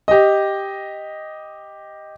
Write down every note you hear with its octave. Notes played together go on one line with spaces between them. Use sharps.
G4 D#5